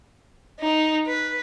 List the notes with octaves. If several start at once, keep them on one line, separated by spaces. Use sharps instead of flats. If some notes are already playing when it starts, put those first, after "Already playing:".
D#4
B4